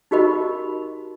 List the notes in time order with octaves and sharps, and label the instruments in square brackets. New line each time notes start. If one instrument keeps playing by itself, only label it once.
[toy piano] D#4 F#4 G4 A#4 D#5 B5